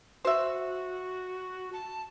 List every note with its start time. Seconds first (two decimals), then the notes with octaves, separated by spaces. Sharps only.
0.25 F#4 C5 E5
1.73 A5